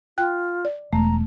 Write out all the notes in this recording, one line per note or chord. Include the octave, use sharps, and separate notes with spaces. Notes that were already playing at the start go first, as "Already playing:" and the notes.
F4 G5 F#6
D5
E1 A3 A#5